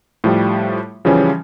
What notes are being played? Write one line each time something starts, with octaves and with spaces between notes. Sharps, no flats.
A2 F3 G3
C#3 E3 F3 G3 C#4